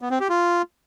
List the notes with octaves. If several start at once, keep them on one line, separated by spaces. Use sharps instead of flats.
B3
C4
G4
F4